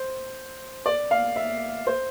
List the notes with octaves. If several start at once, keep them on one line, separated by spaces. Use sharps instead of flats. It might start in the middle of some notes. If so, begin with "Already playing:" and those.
Already playing: C5
D5
F5
E5
C5